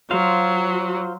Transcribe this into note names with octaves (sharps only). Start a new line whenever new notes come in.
F#3 F4 C5 F5